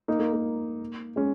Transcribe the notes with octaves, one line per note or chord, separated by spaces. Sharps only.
A#3 D#4
A#3
A#3
G#3 C#4